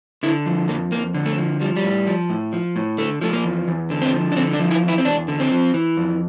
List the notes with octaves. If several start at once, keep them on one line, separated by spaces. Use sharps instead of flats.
D3 E4
F3
F2 A#3
F2 A#3
D3
A3
F3
F3 G3
G3
A2
F3
A2
F3
A2
D3 A3
F3 A3
A#3
E2
E2
D3
C4
F3
D4
D3 C4
D4
F3
E4
E2
E4
C4
E2 D4
D3
C4
F3
E3
F2